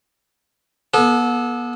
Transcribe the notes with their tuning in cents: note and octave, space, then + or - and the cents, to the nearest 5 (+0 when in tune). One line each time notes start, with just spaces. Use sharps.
B3 -35 A4 -25